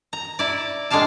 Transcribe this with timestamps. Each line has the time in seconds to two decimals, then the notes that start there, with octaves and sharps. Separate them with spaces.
0.13 A#5
0.39 E4 D5
0.90 A2 G#3 D4 D5 F5 A5